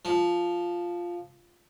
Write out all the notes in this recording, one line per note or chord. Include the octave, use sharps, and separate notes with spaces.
F3